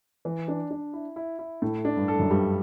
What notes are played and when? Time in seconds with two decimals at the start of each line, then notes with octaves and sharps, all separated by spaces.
0.25 E3
0.48 D4
0.71 D4
0.93 E4
1.16 E4
1.39 E4
1.62 A2 A4
1.85 D4
1.97 G2
2.08 A4
2.19 F#2
2.30 G2 G3